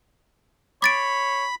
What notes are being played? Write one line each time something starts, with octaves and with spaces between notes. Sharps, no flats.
C#5 B5 D6 A6 D7